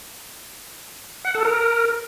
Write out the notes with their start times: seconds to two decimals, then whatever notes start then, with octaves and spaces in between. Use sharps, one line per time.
1.25 F#5
1.35 A4
1.45 A#4